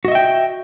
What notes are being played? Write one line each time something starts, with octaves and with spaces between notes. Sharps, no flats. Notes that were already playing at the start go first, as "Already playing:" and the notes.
F#4 D#5 E5 G5